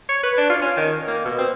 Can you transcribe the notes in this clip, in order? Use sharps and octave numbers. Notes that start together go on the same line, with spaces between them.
C#5
B4
D4
F4
C#4
D#3
A#3
B2
C4